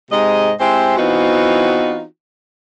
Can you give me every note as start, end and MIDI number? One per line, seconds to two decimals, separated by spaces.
0.11 0.52 44
0.11 0.52 48
0.11 0.52 56
0.11 0.52 75
0.60 0.96 56
0.60 0.96 60
0.60 0.96 64
0.60 0.96 67
0.60 0.96 72
0.98 2.04 52
0.98 2.04 59
0.98 2.04 60
0.98 2.04 63
0.98 2.04 65
0.98 2.04 66